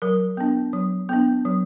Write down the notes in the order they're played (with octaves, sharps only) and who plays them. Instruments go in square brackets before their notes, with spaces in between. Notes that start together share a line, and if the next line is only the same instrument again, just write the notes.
[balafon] F#3 A#4
B3 D4
F#3
B3 D4
F#3